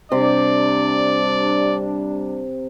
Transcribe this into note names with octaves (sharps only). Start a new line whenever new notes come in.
C3 G3 D4 D5